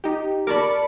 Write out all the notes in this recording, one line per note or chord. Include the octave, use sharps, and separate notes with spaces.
D#4 G4
A#4 D5 A5 B5 C#6 D6